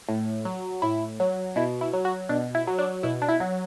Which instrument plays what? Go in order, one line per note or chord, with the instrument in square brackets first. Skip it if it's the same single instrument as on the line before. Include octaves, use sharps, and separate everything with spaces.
[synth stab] A2
F#3
A2 E4
F#3
B2 E4
E4
F#3
F#4
B2 D4
E4
F#3
D4
B2 E4
D4
E4
F#3